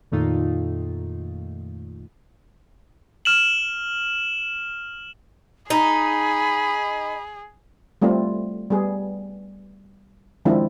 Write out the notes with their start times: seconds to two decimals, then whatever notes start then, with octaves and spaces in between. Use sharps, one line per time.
0.12 F2 A#2 D#3 A3 D#4 F4
3.25 F6 E7 F#7
5.70 D#4 G#4 B5
8.02 G3 A3 C4 F4
8.71 G3 B3 G#4
10.45 D#3 F3 G#3 C4 D4 E4